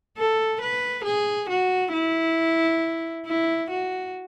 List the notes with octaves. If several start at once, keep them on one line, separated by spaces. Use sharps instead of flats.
A4
B4
G#4
F#4
E4
E4
F#4